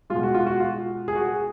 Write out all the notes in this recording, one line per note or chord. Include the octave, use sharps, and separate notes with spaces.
B2 G#3 F4
F#4
F4
F#4
F4
G#4
F#4
G#4